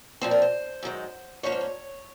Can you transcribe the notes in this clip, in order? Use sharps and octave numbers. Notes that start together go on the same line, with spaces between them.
A#2 F3 C4 C5
A#4
C5
F#2 D#3 G#3
G#2 F3 A#3 C#4 C#5
C5
C#5